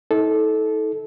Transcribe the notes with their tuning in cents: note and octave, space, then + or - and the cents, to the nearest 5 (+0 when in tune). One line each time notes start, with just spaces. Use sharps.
D#4 +45 A4 -15